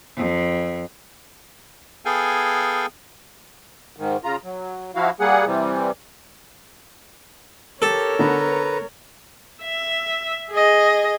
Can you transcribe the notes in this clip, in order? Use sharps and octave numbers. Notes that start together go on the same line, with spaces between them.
F2
B3 G#4 A4 F5 G5 G#5
G#2 D#3
C#3 F4 A#5
F#3
F3 E4 F#4 F5
G3 A#3 G#4 F#5
C3 E3 G3
G4 A4 A#4 C#5
D3 B3 B4 A#5
E5
G#4 D#5